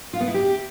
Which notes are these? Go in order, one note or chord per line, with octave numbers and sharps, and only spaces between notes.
F4
B3
E4
G4